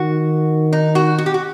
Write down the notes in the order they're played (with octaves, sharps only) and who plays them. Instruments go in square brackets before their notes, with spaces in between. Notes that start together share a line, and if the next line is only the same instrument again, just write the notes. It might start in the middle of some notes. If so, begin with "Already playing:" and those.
Already playing: [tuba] D#3 [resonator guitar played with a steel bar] F#4
[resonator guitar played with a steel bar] D#4
F#4
F#4
G4
F#4